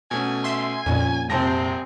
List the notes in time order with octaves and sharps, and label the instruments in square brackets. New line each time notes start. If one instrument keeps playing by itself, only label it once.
[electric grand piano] B2 A3 C#4 [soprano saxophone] G#5
[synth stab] E5 C6
[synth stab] F2 A#2 [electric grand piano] C#4
[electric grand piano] C2 A5 A#6 [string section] C3 C4 [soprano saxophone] G#4